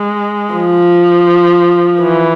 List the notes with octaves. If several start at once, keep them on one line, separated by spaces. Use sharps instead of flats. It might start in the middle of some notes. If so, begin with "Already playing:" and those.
Already playing: G#3
F3
E3